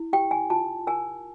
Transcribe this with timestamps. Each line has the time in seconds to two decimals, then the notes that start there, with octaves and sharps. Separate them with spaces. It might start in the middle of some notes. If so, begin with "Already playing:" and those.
Already playing: E4
0.13 G4 G5
0.31 G#5
0.50 F4 A5
0.87 A#4 G#5